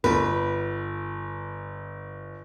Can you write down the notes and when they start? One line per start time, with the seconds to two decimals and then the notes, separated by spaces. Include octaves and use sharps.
0.04 G1 B4